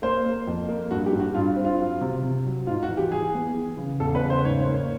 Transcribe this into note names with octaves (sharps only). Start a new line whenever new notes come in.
A#3 C5
A#3
F2
A#3
G2 F#4
G4
G2
F#4
G2 F4
C4
F4
F#3
C3
C3
F#3
G#2 F4
F#4
E3
G4
E3 G#4
B3
E3
C#3
E2 A4
B4
C#3
C5
G#2 C#5
C5
A#3
C#5